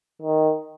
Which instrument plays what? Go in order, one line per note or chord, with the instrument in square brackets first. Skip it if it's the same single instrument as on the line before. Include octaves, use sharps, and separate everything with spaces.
[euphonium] D#3